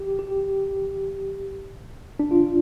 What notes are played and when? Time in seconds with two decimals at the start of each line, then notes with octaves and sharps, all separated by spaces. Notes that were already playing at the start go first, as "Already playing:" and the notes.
Already playing: G4
0.19 G4
2.20 D4
2.31 F4